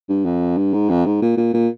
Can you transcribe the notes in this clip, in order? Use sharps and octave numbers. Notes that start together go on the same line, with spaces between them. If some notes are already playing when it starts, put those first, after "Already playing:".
G2
F2
G2
G#2
F2
G#2
A#2
A#2
A#2